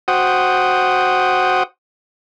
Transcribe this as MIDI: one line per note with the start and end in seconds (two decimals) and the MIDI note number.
0.08 1.63 66
0.08 1.63 72
0.08 1.63 78
0.08 1.63 79
0.08 1.63 87